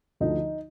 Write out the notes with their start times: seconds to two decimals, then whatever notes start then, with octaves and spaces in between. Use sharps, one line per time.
0.20 D2 D3 F3 D#4